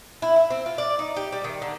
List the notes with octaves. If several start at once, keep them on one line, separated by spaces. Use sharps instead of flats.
E4
E4
C4
F4
D5
D#4
G4
G3
D#3
D3